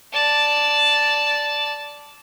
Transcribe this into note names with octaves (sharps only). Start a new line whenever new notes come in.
D5 A5